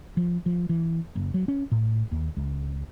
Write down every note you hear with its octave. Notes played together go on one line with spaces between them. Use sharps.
F3
F3
E3
F#1
F#3
C#4
A2
D#2
C#2